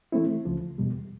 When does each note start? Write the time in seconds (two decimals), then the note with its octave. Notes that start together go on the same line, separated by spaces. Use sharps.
0.12 E3 A3 C4 E4
0.45 C#2 C#3 F3
0.78 E2 B2 G3